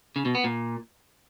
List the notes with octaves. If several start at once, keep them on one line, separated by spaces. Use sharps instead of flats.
C#3
B2
B3
A#2